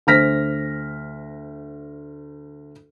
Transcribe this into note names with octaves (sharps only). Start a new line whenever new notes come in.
D2 C5 F6 A#6 B6